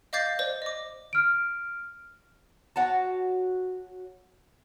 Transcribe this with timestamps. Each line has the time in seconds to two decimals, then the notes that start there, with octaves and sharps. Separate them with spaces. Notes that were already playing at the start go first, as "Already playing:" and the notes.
0.13 D#5 F5 D6 G6 A6 C7
0.39 C5 D5
0.62 D#5 D6
1.13 F6 D7
2.76 F#4 C#5 A5